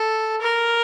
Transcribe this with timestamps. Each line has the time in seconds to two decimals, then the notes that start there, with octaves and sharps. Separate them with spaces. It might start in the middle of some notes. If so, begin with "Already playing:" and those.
Already playing: A4
0.41 A#4